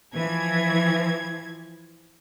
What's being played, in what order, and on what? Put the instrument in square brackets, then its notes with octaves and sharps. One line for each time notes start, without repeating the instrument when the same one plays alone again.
[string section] E3 F3 G#6